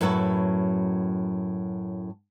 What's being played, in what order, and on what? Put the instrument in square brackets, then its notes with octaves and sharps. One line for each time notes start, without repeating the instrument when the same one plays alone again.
[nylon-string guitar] F#2 A2 F#3 B4 E5 A5